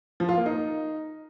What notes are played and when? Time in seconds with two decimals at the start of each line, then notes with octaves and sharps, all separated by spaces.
0.20 F3
0.29 F4
0.37 A#3
0.46 D#4